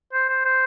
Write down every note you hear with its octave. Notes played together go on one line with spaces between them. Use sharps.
C5
C5
C5